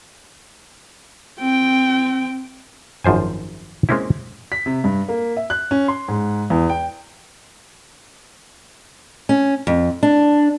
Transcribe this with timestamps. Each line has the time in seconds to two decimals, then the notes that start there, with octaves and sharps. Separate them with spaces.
1.39 C4 G5
3.04 G#1 F#2 F3 C5 G#5
3.89 G#3 A#3 C4 C#4 E4
4.52 B6
4.66 C3
4.84 G2
5.08 A#3
5.37 E5
5.50 F#6
5.71 C#4
5.88 C6
6.08 G#2
6.50 E2
6.69 G5
9.29 C#4
9.67 F2
10.03 D4